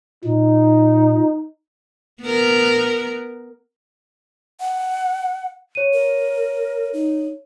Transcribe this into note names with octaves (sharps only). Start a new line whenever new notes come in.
A#2 D#4
B3 A#4
F#5
C#5 D#7
A#4
D#4